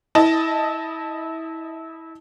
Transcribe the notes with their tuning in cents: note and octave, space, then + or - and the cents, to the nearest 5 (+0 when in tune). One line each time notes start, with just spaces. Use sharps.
E4 -25 D#5 +0 A5 +0